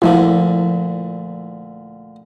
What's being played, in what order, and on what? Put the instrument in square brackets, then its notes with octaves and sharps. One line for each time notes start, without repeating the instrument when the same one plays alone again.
[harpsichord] D2 A#2 D3 [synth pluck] F3 E4